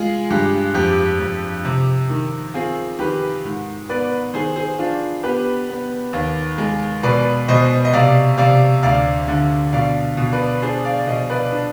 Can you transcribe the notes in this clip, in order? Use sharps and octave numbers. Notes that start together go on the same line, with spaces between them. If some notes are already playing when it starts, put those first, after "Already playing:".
Already playing: G#3 F4 G#4
G2 G4
F2 G4
F2
C3
D#3
C4 F4 G#4
D#3 G4 B4
G#2
B3 B4 D5
D#3 G#4 C5
G#4 C5
D4 F4
B3 G4 B4
B3
D#2
G#3
B2 B4 D5
B2 C5 D#5
D#5
C3 D5 F5
C3 D5 F5
D2 D5 F5
D3
B2 D5 F5
B2
B4 D5
D4 G#4 C5
D5 F5
D5
B2 C5 D#5
B4 D5
D4